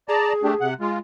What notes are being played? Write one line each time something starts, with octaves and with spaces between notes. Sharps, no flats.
G#4 D5 A5 A#5
A3 D4 G4
C3 F#5
G#3 F4